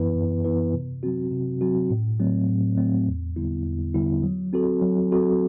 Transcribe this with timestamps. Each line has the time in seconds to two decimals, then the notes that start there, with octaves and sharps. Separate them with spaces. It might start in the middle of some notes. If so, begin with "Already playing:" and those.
Already playing: F#2 E3 B3 E4 B4
0.15 F#2
0.45 E3 B3 E4 B4
0.74 C3
1.03 F#3 C4 F#4
1.31 C3
1.61 F#3 C4 F#4
1.90 A2
2.20 F#3 A3 C4
2.49 A2
2.77 F#3 A3 C4
3.07 E2
3.36 D3 G3 B3 E4
3.66 E2
3.94 D3 G3 B3 E4
4.23 F#3
4.53 C4 F#4 A4
4.82 F#3
5.12 C4 F#4 A4